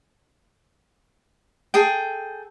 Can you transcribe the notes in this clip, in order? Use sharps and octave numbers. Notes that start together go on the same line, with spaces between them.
G#4 A4 G5